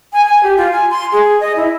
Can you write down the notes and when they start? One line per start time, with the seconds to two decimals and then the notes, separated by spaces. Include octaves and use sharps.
0.13 G#5
0.26 G#5
0.43 G4
0.57 F4
0.72 G#5
0.90 C6
1.12 G#4
1.41 D#5
1.56 E4